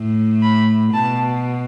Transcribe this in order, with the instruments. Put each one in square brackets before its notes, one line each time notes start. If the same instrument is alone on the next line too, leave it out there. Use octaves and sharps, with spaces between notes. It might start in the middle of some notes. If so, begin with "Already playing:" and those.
Already playing: [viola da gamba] A2
[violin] B5
[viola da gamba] B2 [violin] A5